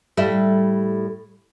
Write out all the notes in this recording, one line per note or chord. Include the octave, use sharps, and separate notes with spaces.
A2 G3 E5